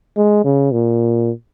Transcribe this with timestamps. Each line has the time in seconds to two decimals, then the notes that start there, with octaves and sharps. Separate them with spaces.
0.17 G#3
0.44 C#3
0.72 A#2